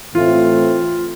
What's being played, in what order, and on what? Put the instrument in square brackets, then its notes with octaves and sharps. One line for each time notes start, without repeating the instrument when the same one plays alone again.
[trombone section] A2 E3 A3 C4 [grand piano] F4